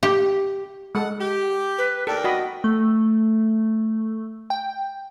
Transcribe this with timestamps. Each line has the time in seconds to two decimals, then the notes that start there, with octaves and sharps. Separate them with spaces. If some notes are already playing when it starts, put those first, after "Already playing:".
0.03 G4
0.95 G#3 A4 F#5
1.20 G4
1.78 B4
2.07 D#2 A4 A#4 D5 G5
2.24 F#4 D#5 B5
2.64 A3
4.50 G5